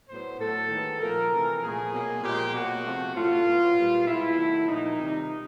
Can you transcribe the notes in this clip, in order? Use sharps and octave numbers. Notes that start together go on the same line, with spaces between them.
A2 F#3 B3 C5
A2 F#3 A3 A4
D#3 G#3 B3
A#2 F3 A3 A#4
C3 E3 A3
A#2 F3 A3 G#4
B2 F#3 A#3
A#2 F3 G#3 G4
B2 F#3 A#3 F#4
C3 F3 A3
A2 F#3 A3 F4
A2 F#3 B3
A#2 G3 B3
B2 G#3 B3 E4
D#3 F#3 A3
A#2 F3 A3 D#4
C3 D#3 G3